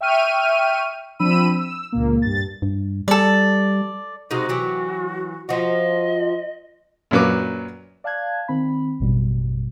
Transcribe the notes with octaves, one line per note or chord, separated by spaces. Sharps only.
E5 G5 C#6 F6 D#7
F3 C4 D4 B5 E6 D#7
E6
C#2 A#2 A#3
G2 A6
G2
G3 A4 D5
C3 G#3 D#4 F#4
E3 F#3 G4
F3 F#4 D#5
F#2 A#2 F#3 B4 D6
D5 F5 A5 F#6 G#6
D#3 C4 B5
A1 F#2 B2 G3